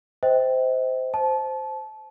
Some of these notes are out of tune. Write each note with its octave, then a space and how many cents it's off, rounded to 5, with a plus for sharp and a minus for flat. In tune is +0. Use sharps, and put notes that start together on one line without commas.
C5 -15 D#5 +40 G5 +0
C5 +0 A5 -25